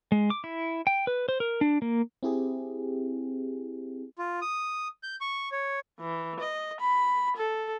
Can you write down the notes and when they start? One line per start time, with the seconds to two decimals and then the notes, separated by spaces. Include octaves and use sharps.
0.12 G#3
0.30 D6
0.44 E4
0.87 G5
1.07 B4
1.29 C5
1.40 A#4
1.61 D4
1.82 A#3
2.23 C4 E4 G4 G#4
4.17 F4
4.41 D#6
5.03 G6
5.21 C#6
5.52 C#5
6.01 E3
6.40 D#5
6.80 B5
7.37 A4